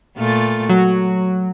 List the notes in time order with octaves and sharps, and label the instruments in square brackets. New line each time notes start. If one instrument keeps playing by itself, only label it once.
[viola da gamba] A#2 A3 F4
[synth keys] F#3 [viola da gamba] F#4